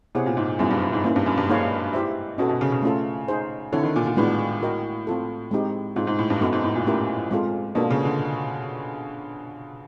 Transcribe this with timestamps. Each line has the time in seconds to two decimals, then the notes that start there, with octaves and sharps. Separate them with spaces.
0.15 C3 B3 E4 G#4 C#5 F#5
0.26 A#2
0.37 G#2
0.59 F#2 G3 B3 E4 G#4
0.71 G2
0.82 G2
0.93 G#2
1.03 G#2 A#3 C#4 E4
1.16 G2
1.26 F#2
1.37 G2
1.49 G#2 A#3 D#4 G#4 C#5 F5
1.94 E4 G4 C5 E5
2.38 B2 C#4 F#4 A4
2.49 B2
2.61 C#3
2.72 C#3
2.82 A3 C#4 F4 A4
3.28 D#4 G#4 C5
3.73 D3 C4 E4 A4 C#5
3.83 D#3
3.96 A#2
4.06 A#2
4.17 A2 G#3 B3 D4 F#4 B4
4.63 F#4 A#4 D#5 G5
5.07 C4 F4 A4
5.51 G#3 C4 D#4 G4
5.96 G#2 G#3 C4 F4
6.07 G#2
6.19 A2
6.30 G2
6.41 F#2 B3 D#4 F#4 A4
6.53 G#2
6.64 A2
6.75 A#2
6.86 A3 C#4 E4 G4 A#4
7.31 G#3 C4 F4 A4
7.75 B2 A#3 D4 F4 A4
7.90 C#3
8.05 D3